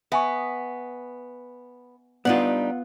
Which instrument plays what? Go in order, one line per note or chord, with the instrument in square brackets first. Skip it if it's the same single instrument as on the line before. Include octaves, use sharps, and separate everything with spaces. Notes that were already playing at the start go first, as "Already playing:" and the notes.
[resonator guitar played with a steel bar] B3 [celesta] E5 G#5 C#6
[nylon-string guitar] G3 D4 D#4 [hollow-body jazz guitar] B3 F4 [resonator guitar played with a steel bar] F#5